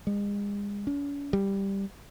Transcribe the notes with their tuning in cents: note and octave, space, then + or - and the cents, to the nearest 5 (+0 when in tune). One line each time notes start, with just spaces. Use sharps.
G#3 -40
C#4 +45
G3 +5